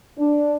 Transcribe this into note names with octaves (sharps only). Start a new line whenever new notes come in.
D4